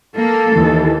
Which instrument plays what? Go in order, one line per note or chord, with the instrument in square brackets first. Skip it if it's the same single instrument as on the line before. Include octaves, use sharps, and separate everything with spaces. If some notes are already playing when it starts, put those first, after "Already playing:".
[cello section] A#3 [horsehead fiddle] A4
[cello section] D#2 [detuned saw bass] E3